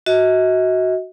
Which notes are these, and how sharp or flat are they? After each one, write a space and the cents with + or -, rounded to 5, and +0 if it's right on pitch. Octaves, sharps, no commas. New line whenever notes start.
F#4 +0 D#5 +40